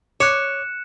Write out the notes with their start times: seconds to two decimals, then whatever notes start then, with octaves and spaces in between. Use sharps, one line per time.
0.20 C#5 D6 F#6 C#7 E7